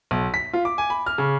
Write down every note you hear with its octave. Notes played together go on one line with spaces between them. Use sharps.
B1
B6
F4
D6
G#5
B5
F6
C#3